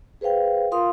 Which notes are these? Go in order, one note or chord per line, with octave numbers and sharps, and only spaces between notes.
G#4 B4 C5 F5 G5
F4 A#4 F5 C6 D#6